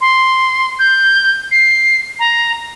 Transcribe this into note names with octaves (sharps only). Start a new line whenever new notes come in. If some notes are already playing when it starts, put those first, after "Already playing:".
C6
G6
C7
A#5